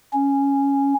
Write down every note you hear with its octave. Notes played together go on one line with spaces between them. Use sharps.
C#4